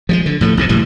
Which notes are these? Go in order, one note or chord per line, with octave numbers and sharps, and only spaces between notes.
F3 F#3 G#3
D3
A2 F3 G#3 A3
B1 G#2 C3
F#1 A2 E3 G3